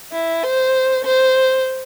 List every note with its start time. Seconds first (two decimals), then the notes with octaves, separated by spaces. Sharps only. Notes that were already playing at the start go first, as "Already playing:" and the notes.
0.12 E4
0.43 C5
1.05 C5